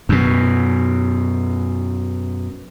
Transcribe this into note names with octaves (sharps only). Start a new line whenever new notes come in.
F#2 B2